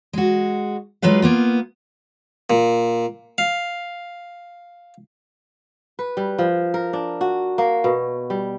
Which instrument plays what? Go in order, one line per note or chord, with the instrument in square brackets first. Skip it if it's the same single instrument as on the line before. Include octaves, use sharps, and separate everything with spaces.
[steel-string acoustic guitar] G#3 F#4
F#3 G#3 F4 B4 F5
A#3 B3 F4
[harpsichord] A#2
F5
[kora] B4
G3
F3
A#4
D4
F#4
A#3
B2
G3